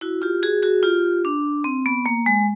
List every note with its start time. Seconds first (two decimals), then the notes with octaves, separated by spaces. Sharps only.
0.01 E4 F#4
0.22 F4 G4
0.43 F#4 G#4
0.62 F#4 G#4
0.83 F4 G4
1.25 D4
1.64 C4
1.86 B3
2.06 A#3
2.26 G#3